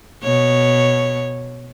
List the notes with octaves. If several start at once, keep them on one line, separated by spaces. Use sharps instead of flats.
B2 C#5